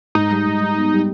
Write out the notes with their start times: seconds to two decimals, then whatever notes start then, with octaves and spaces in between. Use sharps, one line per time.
0.15 G#2 D#4
0.30 G3
0.46 G#2
0.61 G3
0.77 B3
0.92 G3